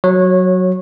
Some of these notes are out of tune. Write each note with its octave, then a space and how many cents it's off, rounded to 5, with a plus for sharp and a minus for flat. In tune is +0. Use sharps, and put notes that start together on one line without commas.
F#3 +0 C#5 -20